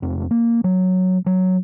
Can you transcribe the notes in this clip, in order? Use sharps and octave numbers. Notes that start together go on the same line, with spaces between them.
E1 F2
A#3
F#3
F#3